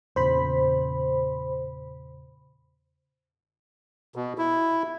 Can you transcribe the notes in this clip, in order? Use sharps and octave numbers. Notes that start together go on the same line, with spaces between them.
E2 A#2 C#3 C5 B5
B2
E4